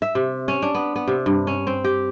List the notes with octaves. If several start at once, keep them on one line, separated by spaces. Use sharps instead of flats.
E5
C3
C#4
D4
B3
B3
C3
G2
C#4
C4
G4